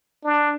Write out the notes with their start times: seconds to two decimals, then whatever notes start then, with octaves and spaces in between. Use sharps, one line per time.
0.25 D4